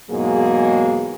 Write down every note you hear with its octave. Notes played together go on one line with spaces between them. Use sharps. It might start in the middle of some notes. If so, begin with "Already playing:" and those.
E2 G#2 B2 F#3 A#3 G#4